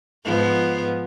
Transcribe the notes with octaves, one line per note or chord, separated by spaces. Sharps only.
G#2 F3 B3